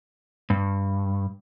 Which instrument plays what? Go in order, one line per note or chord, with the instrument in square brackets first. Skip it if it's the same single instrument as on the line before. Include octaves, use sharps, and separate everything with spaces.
[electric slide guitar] G2